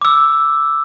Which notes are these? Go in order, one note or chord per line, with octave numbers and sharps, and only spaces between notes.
D6 E6